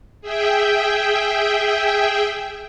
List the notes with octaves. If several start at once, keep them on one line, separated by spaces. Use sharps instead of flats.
G#4 E5 G5